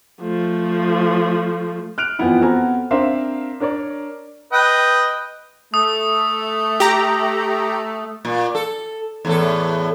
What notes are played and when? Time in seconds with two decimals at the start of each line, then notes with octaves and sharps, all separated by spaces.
0.21 F3 A3
1.98 F6 F#6 D7 F7
2.19 F2 E3 F3 B3 E4
2.41 B3 C4 F#4 A4 G#5 A#5
2.91 C4 D4 A#4 E5 F5 C6
3.60 D4 A#4 C#5 D5
4.53 B4 D#5 G5
5.74 A3 D#6
6.80 G4 A#5
8.25 A#2
8.55 A4
9.25 E2 A2 A4